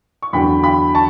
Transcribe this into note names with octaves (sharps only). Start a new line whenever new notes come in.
C#6
E2 D3 F#3 G5 B5
G5 B5
A5 C#6